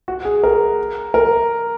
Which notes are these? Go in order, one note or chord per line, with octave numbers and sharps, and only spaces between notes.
F#4
G#4
A#4
A#4